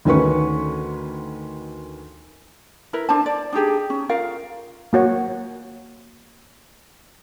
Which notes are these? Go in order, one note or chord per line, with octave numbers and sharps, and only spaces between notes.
D2 D#3 C#4 B4 C#6
E4 A#4 B4
D4 C5 A5
D5
D4 D#4 G4 G#4
C#4
F4 A#4 F5
A#3 F#4 C#5